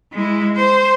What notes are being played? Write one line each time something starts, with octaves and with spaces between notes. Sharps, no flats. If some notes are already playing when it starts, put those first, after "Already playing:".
G#3 E4
C5